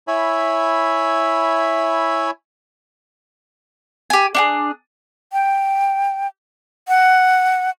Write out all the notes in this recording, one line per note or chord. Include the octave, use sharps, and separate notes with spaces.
E4 C#5 E5 G#5 B5
G4 G#5
D4 F#4 G#4
G5
F#5